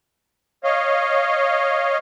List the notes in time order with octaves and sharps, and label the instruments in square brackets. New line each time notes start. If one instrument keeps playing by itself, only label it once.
[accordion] C#5 D#5 F5